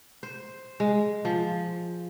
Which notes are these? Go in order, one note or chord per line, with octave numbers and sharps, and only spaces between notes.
C5
G#3
F3